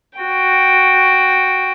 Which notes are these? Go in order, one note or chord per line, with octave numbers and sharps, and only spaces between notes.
F#4 G5